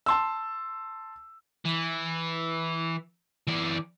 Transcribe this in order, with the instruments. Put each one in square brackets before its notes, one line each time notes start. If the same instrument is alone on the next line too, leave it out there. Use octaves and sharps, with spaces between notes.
[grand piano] A5 C6 E6
[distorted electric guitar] E3
E3 D5